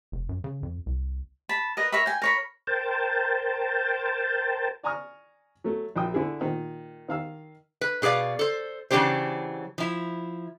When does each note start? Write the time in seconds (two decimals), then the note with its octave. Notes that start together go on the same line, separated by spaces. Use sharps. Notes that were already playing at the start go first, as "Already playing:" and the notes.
0.12 F1
0.29 F#2
0.44 C#3
0.63 F2
0.86 C2
1.49 A5 B5
1.77 A#4 B4 D#5
1.92 A#4 C#5 E5 B5
2.06 G5 G#5
2.22 A#4 C#5 B5
2.67 A#4 C5 G5 A5
4.83 D5 G#5 A#5 C#6 D#6 F6
5.64 F#3 A3
5.96 A#1 F#3 G5 D#6
6.14 D3 E4 G#4
6.40 A#2 D#3
7.08 D#3 F5 E6
7.81 B4
8.02 B2 G#4 B4 D5 F5
8.39 A4 C5
8.91 C#3 E3 F#3 D4 G4 C5
9.78 F3 E4